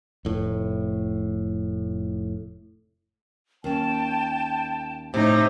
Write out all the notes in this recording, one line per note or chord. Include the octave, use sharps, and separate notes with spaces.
F1 A2
D#2 C#4 G5 A5
A2 C3 D#4 E5